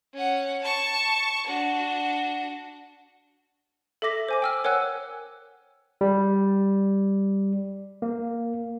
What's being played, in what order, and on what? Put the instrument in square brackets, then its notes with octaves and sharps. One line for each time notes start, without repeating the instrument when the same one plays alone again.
[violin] C#4 F#5
A5 C#6
D4 F#4
[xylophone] A4 E5 D6 A#6 B6
C5 G#5 D6
G5 E6 F6
A#4 C#5 F#5 G#5 E6 F#6
[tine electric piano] G3
A#3